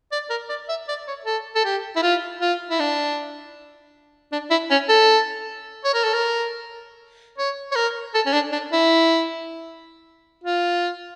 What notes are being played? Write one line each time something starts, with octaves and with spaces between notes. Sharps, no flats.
D5
A#4
D5
E5
D5
C#5
A4
A4
G4
E4
F4
F4
E4
D4
D4
E4
C#4
A4
C#5
A#4
A4
A#4
C#5
C#5
A#4
A4
C#4
D4
D4
E4
F4